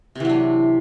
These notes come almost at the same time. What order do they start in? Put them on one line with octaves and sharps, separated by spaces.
C3 E3 F#3 D4